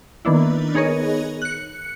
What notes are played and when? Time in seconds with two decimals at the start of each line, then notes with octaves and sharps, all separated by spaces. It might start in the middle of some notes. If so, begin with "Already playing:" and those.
0.25 D#3 A#3 B3 D4 E4
0.74 B3 D#4 G#4 A#4 C#5 D#5
1.42 F#6 C#7